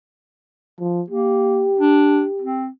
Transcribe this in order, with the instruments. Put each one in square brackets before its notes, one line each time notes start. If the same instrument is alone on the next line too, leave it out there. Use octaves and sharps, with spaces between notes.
[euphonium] F3
[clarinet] A#3 [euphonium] G4
[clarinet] D4
C4